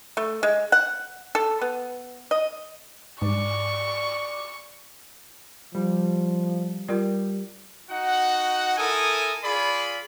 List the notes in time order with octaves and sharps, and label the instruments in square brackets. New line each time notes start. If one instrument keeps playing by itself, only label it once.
[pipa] A3
G#3
F#5
A4
B3
D#5
[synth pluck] G#2 [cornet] D5 [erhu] C#6
[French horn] F3 [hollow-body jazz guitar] G3
[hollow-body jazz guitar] G3 [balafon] F4 A#4 D5
[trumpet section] D#4 F#4 F#5
E4 A4 A#4 G#5 D#6
F4 G#4 D5 B5